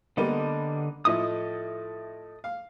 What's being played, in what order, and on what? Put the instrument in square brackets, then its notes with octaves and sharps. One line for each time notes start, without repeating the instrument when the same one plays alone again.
[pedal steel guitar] D3 A4 D#5 [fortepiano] G3 A#3 B3
[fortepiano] A2 F3 E4 [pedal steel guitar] A4 D#5 D#6
[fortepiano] F5